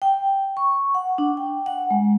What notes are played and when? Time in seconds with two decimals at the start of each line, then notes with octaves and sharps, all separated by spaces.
0.02 G5
0.57 C#6
0.95 F#5
1.18 D4
1.37 G5
1.66 F#5
1.90 G#3